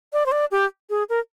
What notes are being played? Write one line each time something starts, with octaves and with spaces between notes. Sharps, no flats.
D5
C5
D5
G4
G#4
A#4